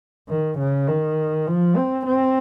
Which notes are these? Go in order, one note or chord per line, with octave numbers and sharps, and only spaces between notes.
D#3
C#3
D#3
F3
C4
C4